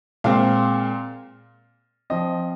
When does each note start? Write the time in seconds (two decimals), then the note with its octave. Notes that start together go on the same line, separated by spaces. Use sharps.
0.24 A#2 G#3 C4 F5
2.10 F3 C4 D#5